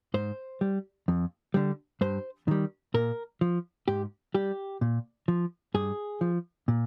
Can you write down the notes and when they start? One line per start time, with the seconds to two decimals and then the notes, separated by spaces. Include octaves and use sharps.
0.14 G#2 C5
0.61 G3
1.08 F2
1.54 D3 G3
2.01 G2 C5
2.48 D#3 G3
2.94 A#2 A#4
3.41 F3
3.88 G#2 G4
4.34 G3 G4
4.81 A#2
5.28 F3
5.74 G2 G#4
6.21 F3
6.68 A#2